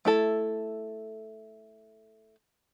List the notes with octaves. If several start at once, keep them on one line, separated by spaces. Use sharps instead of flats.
A3 E4 A4